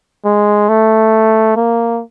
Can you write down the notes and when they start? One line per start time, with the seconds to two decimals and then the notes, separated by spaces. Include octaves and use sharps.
0.25 G#3
0.69 A3
1.56 A#3